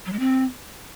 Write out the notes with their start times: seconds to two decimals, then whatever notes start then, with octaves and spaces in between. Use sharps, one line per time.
0.06 F#3
0.12 G#3
0.19 C4